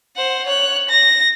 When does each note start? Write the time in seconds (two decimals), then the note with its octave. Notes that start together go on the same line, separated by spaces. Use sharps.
0.16 C5 F#5
0.47 C#5 F#6
0.89 A#6